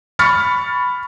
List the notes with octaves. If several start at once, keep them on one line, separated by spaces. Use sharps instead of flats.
B5 C#6 F6 A6 B6 C#7